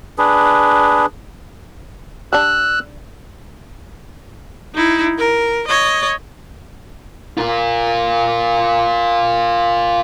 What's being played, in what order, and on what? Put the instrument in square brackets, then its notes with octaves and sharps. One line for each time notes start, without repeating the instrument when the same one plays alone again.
[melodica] D4 G#4 B4
[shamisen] G3 D4 [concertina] E6 F#6
[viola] D#4 E4
A#4
C#5 D#5
[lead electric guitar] F4 A#4